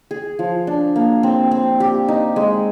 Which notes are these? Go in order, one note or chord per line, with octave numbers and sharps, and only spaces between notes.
G#4
F3
D4
A#3
C4
C4
G4
D#4
G#3